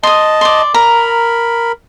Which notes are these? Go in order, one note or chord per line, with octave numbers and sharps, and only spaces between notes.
D#5 A5 C6 D#6
D5 C6
A#4 A#5 B5